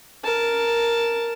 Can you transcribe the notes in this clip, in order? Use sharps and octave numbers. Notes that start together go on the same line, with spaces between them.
A#4 A5